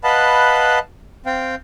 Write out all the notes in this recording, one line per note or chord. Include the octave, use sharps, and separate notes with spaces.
B4 D#5 F5 F#5 A5 B5
C4 F5 G5